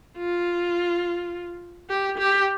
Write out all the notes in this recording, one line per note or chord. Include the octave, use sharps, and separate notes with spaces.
F4
G4
G4